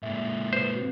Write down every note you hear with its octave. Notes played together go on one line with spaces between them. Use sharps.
A#2 G#3 E5
B4 C5
C4 F#4